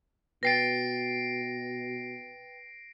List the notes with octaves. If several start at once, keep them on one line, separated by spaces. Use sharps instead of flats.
B2 B4 G5 A6 A#6 C7 D7